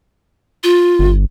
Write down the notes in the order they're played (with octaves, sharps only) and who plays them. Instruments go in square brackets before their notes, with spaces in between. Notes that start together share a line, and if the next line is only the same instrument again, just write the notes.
[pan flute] F4
[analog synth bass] G1